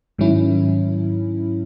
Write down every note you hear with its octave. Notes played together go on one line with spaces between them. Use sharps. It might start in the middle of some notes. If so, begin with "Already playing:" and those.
G#2 D#3 F#3 C#4 E4